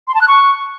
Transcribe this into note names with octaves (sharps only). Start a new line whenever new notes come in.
C6
A5
F#6
C#6